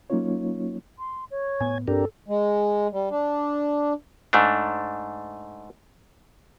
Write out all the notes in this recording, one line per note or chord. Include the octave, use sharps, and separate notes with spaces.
F#3 A#3 C#4 D#4 F4 C#5
C6
C#5
A2 B3 G#5
G2 C4 D4 G4 A4 A#4
G#3
G3
D4
G#2 A3 D4